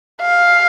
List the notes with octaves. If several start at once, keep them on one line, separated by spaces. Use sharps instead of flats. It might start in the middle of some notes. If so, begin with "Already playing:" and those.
F5